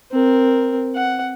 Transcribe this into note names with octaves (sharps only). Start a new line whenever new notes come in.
C4 A#4
F#5